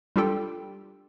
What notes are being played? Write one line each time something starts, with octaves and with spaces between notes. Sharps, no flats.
G3 D4 F4 G4 A4 G5